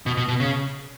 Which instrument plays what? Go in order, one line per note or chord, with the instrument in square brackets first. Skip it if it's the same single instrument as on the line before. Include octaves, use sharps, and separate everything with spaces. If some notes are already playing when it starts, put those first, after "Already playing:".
[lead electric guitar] B2
B2
B2
C#3